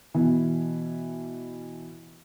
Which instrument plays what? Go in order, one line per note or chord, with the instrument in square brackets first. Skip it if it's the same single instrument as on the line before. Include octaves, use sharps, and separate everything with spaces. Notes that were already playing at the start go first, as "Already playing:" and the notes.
[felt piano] B2 E3